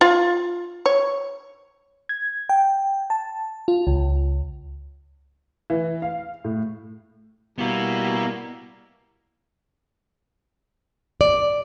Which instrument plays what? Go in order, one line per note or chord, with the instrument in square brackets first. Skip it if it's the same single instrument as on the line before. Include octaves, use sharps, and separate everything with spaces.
[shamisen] F4 F5
C#5
[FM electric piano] G#6
G5
A5
F4
C#2
[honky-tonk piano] E3
F5
A2
[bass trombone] G3 [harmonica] A#3 E4 [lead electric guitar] B3 F#4
[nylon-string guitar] D5